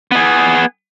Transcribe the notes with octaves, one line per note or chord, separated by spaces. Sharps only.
B3 G#4